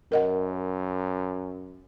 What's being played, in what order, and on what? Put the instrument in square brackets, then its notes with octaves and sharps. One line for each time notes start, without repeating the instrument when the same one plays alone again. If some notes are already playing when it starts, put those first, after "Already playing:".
[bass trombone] F#2 [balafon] A#4 D#5 F#5